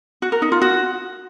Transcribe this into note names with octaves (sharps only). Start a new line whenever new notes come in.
F#4
A#4
D#4
F4
F#4